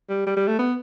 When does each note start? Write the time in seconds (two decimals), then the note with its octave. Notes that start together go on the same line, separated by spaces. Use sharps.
0.09 G3
0.27 G3
0.37 G3
0.48 A3
0.59 B3